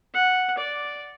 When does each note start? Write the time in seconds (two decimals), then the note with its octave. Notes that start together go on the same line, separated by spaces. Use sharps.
0.14 F#5
0.58 D5